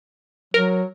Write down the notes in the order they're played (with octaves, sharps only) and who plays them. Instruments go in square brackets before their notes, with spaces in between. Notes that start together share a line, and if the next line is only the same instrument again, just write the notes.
[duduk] F#3 [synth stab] A#4